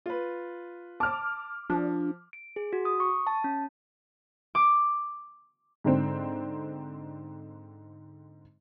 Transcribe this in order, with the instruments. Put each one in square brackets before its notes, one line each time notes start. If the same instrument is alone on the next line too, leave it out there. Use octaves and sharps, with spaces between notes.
[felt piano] F4 B4
[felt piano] A5 [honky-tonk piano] D6 F6
[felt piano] F3 [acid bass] D4
[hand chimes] D7
G#4
F#4
D#6
C#6
A5
C#4
[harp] D6
[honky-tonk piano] G#2 D3 C4